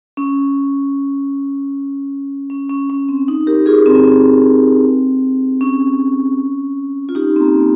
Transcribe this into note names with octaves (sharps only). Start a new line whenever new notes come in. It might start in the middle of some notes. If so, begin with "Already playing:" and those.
C#4
C#4
C#4
C#4
C4
D#4
G4 A#4
F4 G#4
C4
C#4
F4
D#4 G4
C4
A#3
A#3